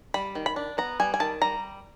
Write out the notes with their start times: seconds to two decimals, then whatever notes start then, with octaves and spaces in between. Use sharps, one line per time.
0.14 G3 B5
0.35 D#3
0.46 B5
0.56 D4
0.78 B3 A#5
1.00 G3 G#5
1.14 G#5
1.20 D#3 A5
1.42 G3 A#5